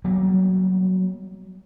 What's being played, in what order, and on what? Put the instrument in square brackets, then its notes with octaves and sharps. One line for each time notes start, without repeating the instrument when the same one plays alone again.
[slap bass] F#3 G3 A#3 B3